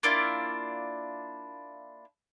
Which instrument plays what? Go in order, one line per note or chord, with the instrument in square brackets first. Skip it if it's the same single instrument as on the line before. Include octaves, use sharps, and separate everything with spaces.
[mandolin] A#3 D4 E4 F4